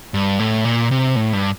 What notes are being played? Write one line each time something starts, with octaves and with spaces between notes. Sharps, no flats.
G2
A2
A#2
C3
A2
G2